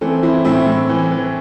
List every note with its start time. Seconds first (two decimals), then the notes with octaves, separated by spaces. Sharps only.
0.01 E3 A3 C4
0.23 E3 C4 E4
0.45 A2 C4 E4
0.66 A2
0.89 E3
1.11 E3